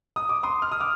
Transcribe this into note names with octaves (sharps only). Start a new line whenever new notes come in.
D#6
D6
C6 D#6
F6
D#6
D6 F6